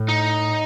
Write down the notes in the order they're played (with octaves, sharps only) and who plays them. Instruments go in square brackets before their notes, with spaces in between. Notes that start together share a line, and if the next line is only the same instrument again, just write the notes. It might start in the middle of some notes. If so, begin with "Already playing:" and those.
Already playing: [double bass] A2
[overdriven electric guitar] D#4